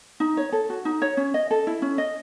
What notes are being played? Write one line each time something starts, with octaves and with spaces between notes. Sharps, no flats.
D#4
C#5
A4
F#4
D#4
C#5
C#4
D#5
A4
E4
C#4
D#5